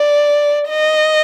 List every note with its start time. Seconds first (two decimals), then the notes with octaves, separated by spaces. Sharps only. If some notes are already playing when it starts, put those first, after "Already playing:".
Already playing: D5
0.69 D#5